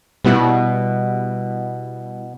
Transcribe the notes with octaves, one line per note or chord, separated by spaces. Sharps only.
B2 G3 B3 E4